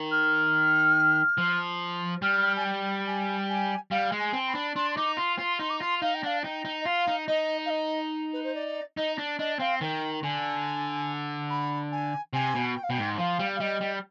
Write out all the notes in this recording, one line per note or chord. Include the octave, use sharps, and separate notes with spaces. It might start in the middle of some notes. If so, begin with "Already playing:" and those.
Already playing: D#3
F6
F3
G3 F6
G#5
G5
G#5
G#5
G3 F5
G#3
G#5
C4
B5
D4
D4 C6
C6
D#4 D6
F4 C6
F4 C6
D#4 C6
D6
F4 C6
D#4 F5
G5
D4 F5
D#4 G5
D#4
D#5
F4 F5
D#4
D#4 D#5
F5
D#5
B4
C5
D5
D#4 D#5
D4
D4 D#5
C4 F5
D#3 G5
D3 G#5
B5
G#5
C3 G#5
B2
G5
F5
B2 G5
G#2
F3 F5
G3
F5
G3 D#5
G3